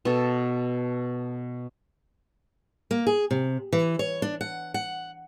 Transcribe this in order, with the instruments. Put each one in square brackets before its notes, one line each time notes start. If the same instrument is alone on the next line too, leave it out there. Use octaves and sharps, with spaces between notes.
[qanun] B2 A4
[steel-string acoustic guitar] A#3
G#4
C3
E3
C#5
D4
F#5
F#5